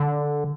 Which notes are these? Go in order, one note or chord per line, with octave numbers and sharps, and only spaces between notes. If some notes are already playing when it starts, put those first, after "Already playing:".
Already playing: D3